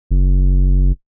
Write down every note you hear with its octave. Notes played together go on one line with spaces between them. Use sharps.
F#1